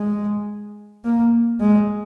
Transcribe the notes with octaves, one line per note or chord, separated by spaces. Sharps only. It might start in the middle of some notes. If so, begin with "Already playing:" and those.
Already playing: G#3
A#3
G#3